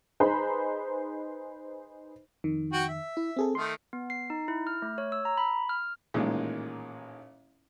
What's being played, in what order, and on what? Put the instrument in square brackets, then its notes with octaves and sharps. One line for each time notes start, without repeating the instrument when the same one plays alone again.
[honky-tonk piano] D#4 G#4 B4 C5 A#5 B5
[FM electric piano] F2 D#3
[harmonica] F#4 G5
E5
[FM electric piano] E4
C4 G#4 A4
[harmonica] D#3 A3 [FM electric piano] C6
[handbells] B3
C7
D#4
E4
F6
A3
C#5
E6
A#5
B5
F6
[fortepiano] A1 A#2 D#3 G#3